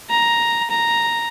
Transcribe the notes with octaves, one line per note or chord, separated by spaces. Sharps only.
A#5
A#5